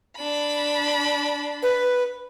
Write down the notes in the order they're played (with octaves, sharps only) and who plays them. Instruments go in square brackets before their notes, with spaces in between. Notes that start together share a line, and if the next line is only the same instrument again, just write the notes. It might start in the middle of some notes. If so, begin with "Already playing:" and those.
[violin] D4 B5
[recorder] B4